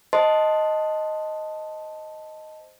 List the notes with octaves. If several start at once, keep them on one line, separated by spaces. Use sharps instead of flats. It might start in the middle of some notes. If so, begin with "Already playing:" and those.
C5 D#5 A5 C6